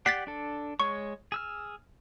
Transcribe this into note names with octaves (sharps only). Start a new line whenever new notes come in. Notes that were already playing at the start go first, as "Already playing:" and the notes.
G4 D5 F#5 A6 B6 C7
D4 A4
G#3 C#5 C#6
G#4 E6 F6